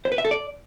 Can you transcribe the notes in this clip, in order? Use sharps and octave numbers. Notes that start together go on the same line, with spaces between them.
C5
B4
E5
A4
D5